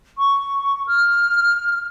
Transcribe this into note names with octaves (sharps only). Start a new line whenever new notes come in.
C#6
F6